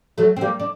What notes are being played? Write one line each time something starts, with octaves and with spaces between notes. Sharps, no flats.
F#3 A3
C4
G3 A#3
D4